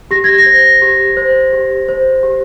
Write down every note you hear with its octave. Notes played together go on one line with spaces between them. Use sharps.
G4 A#6
G#6
A#6
C5
G4
C5
G4
C5
G4